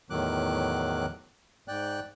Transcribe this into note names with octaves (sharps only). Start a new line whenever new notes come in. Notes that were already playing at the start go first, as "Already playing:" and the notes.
E2 A2 D#3 F#3 D6 F#6
G#2 D5 G5 F#6